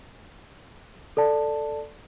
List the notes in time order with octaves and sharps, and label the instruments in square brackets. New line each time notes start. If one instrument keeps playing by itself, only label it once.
[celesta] A4 D5 A5